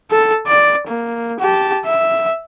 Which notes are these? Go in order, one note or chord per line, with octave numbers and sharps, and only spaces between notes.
A4
D5
A#3
G4 A5
E5